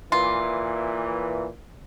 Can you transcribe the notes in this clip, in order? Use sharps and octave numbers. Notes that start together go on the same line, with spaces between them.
A#2 E3 F4